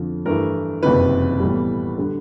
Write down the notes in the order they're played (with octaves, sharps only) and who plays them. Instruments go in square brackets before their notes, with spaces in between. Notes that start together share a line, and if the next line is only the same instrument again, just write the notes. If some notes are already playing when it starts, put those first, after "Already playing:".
Already playing: [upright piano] F2 D3 F3
G2 E3 A3 A#4
F#1 F2 C3 D#3 B4
B1 A2 E3 G3
D3 G3